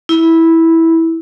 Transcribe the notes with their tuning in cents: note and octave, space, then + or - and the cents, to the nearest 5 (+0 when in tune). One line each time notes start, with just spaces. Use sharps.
E4 -10